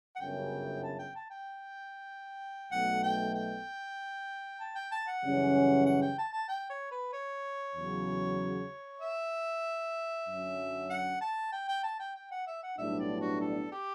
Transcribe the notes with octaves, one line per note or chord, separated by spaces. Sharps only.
F#5
G1 F#2 C#3 G5
A5
G5
A5
G5
B1 B2 A3 F#5
G5
G5
A5
G5
A5
F#5
F#2 C#3 E3 G3 C#4
F#5
G5
A5
A5
G5
C#5
B4
C#5
E2 C#3 F#3
E5
F#2 D3 F#3 C#4
F#5
A5
G5
G5
A5
G5
G5
F#5
E5
F#5
B1 A2 G3 B3 D4 E5
D5
F#4
A4
G4